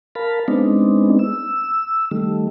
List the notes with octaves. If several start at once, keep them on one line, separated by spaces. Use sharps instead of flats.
A#4 F5 A5 B5
G#3 B3 C4 D4 D#4
E6
D#3 G3 A3